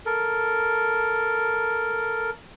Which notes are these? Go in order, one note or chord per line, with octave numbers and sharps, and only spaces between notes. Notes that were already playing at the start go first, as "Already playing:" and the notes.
A4 A#4